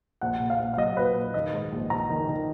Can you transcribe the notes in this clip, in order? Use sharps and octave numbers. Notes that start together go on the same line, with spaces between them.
A#1 F#5
A#2
F5
A#1
F5
F#3 D#5
A#2 B4
A#2
D#3 D#5
G#2
A#1
A#1 A#5
D#3
D#3